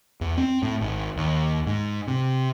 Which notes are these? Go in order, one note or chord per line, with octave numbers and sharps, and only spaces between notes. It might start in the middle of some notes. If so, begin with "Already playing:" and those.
E2
C4
A2
G#1
D#2
G#2
C3